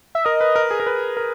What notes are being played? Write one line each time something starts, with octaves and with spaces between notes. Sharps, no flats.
E5
A#4 D#5
B4
A#4
G#4
A#4
B4
A#4